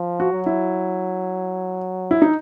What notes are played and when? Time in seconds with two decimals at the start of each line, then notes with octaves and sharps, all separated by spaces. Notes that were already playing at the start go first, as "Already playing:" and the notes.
Already playing: F3
0.20 F#4
0.33 F#3
0.46 E4
2.11 E4
2.22 D#4